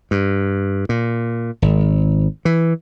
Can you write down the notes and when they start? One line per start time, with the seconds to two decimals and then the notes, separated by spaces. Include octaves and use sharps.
0.11 G2
0.89 A#2
1.62 G#1
2.45 E3